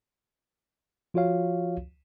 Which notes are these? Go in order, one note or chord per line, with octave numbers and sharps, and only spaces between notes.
F3 F4 F#4 C#5 F5